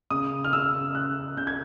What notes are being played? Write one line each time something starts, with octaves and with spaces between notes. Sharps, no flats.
C#3 D#6
F6
C#3 E6
C#3 F#6
C#3 G6
G#6